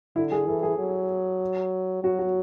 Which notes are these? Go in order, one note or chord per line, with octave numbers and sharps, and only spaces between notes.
D3 E4
G#4
E3 A4
G#4
F#3
F#3 F#4
F#4